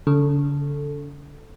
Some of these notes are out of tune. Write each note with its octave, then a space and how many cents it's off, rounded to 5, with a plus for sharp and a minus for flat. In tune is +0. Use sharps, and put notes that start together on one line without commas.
D3 -45 A4 +0